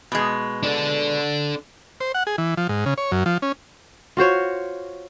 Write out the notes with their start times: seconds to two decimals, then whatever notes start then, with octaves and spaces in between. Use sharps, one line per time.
0.12 B2 G#3
0.63 D4 A4
2.00 C5
2.14 F#5
2.27 G#4
2.38 E3
2.57 F3
2.69 G#2
2.86 C#3
2.98 C#5
3.12 F#2
3.26 F3
3.42 C#4
4.17 F4 F#4 C5 C#5